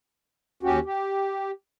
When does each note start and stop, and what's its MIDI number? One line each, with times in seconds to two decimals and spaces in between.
0.63 0.80 39
0.63 0.80 61
0.63 0.80 66
0.63 0.80 67
0.85 1.51 67